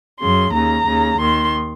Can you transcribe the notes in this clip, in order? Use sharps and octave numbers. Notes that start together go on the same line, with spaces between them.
F#2 C#3 C6
D#2 C#3 A#5
D#2 C#3
D#2 D#3 C6